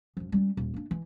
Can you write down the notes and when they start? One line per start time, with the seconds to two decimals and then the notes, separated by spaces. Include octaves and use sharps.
0.17 F#2 F3
0.32 G3 C#4
0.57 D#1
0.74 A#3 D4
0.91 E3